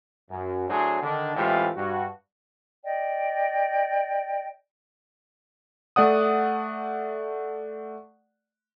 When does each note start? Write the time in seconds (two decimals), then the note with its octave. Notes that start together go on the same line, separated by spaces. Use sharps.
0.30 F#2
0.69 A2 F#3 D4 G#4 C5
1.02 D3 D#3 D4
1.36 A2 E3 G#3 C4 F4 G4
1.75 G2 F#4
2.84 D5 D#5 G5
5.96 A3 D5 F#5 D#6